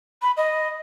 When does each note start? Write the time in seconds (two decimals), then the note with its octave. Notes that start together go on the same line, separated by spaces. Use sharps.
0.22 B5
0.37 D#5